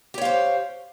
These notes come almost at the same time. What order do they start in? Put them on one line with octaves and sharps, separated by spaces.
G4 C#5 F5 C5